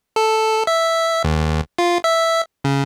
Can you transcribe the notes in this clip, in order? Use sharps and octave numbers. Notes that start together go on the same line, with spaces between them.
A4
E5
D#2
F4
E5
C#3